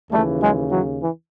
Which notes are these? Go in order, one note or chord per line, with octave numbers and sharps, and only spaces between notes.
D#2 C#3 E3 G3 A3
F#3 G#3
E3 F#3
E3